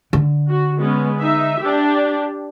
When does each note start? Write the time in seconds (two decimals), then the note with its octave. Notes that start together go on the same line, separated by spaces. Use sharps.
0.13 D3
0.48 F#4
0.78 G#3 B3 C#4
1.19 D#4 E5
1.61 D4 G4